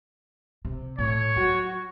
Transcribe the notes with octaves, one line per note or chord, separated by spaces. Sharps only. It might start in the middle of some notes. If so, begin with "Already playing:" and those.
C3
A2 C#5
F#3 F#4